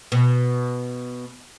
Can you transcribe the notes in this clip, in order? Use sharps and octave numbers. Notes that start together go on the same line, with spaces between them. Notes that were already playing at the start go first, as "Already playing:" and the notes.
B2